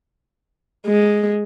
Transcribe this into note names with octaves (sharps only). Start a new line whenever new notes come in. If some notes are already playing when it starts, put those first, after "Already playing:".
G#3